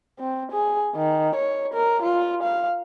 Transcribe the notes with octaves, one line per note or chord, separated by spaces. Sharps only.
C4
G#4
D#3
C#5
A#4
F4
F5